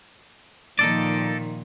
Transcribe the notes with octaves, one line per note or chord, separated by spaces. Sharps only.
A#2 D#3 F3 D#4 A4 D5